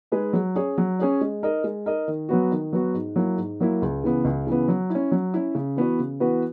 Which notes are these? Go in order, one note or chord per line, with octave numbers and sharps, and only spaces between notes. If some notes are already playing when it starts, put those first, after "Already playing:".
G#3 D#4 G#4 B4
F#3
C#4 G#4 C#5
F#3
C#4 G#4 C#5
G#3
D#4 A#4 D#5
G#3
D#4 A#4 D#5
D#3
F#3 B3 F#4
D#3
F#3 B3 F#4
G#2
F#3 A#3 E4
G#2
F#3 A#3 E4
C#2
C#3 E3 B3
C#2
C#3 E3 B3
F#3
E4
C#4
F#3
C#4 E4
C#3
E3 B3 F#4 B4
C#3
E3 B3 F#4 B4